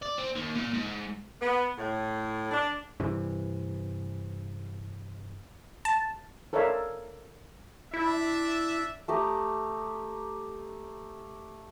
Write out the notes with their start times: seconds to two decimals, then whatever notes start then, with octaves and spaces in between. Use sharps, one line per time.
0.03 D5
0.18 C4
0.36 D#2
0.57 A#2
0.74 G#2
1.41 B3
1.77 A2
2.51 D4
3.00 G2 C3 E3
5.85 A5
6.53 A4 A#4 C#5 D5 E5 F5
7.94 D4 E4 E5
9.08 A3 G4 A#5 D#6